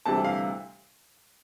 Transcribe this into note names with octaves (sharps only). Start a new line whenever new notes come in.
D2 C3 E3 G3 A5
F5